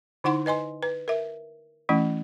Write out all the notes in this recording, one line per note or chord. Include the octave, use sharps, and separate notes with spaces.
D3 D#4 E4 F#5 C6
B4 D#5 G#5 C6
B4
A#4 E5
E3 A3 C#4 E4